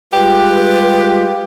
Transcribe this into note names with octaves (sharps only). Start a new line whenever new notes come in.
G3 G#3 F4 G4 B4